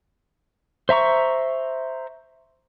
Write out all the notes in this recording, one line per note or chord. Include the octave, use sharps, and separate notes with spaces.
C5 E5 A#5 C#6